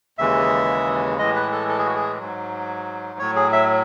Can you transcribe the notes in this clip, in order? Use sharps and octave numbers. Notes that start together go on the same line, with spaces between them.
D#2 C#3 E3 G#3 E5
A2 E3 G#3 D#5
B4
A4
A4
G#4
F#4
G#4
G#2 F#3
A2 F#3 C#5
G#4
E5